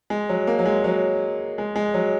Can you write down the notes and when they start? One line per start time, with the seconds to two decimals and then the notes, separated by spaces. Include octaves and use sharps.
0.10 G#3
0.29 F#3
0.47 A#3
0.59 F#3
0.66 G#3
0.84 F#3
1.58 G#3
1.76 G#3
1.94 F#3